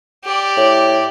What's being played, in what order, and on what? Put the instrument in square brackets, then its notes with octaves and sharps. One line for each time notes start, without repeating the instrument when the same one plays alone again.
[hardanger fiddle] G4 D5
[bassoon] A2